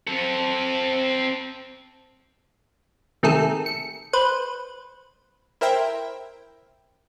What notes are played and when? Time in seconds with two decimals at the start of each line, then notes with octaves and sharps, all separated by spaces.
0.07 C4 A4
3.23 C3 D#3 A3 G#4 A4
3.66 C#7
4.13 B4 C5
5.61 E4 A#4 C5 E5 G5